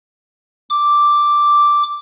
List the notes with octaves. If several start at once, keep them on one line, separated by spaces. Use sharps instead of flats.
D6